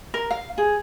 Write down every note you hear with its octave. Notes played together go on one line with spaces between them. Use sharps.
A#4
F5
G#4